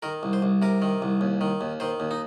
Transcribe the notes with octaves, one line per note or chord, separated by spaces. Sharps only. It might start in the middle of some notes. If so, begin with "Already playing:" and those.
D#3 A#4
C2
C5
C2
C3 A#4
D#3
C2
D#2
D#3
D#2
D#3 C5
D#2
D#4